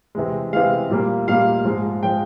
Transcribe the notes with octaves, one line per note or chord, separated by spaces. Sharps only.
C3 E3 G#3
C3 E3 G#3 F5
A#2 G3 A#3
A#2 G3 A#3 F5
G#2 F3 G#3
F3 G#3 G5